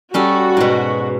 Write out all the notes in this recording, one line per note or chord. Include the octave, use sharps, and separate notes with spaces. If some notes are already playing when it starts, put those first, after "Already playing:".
G3 C#4 F#4 A4
G#2 B2